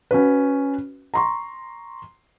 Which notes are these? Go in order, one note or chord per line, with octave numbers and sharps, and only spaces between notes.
C#4 F#4 B4
A#5 C6 C#6